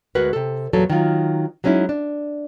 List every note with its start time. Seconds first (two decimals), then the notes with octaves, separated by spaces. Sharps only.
0.15 D2 G#3 F#4 A#4 B4
0.33 C3 A4
0.73 E2 A#2 F#3 A4
0.90 D#3 F#3 F4
1.64 F#3 G#3 C#4 D#4 E4
1.89 D4